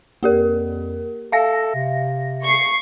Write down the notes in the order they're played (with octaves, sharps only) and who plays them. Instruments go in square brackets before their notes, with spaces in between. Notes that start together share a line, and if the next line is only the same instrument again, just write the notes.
[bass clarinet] F2 [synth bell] A#3 G4 A#4
[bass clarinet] A4 [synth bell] E5 F5 A#6
[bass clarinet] C3
[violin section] C#6 C7